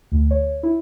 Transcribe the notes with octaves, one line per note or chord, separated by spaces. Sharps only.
D2
C#5
E4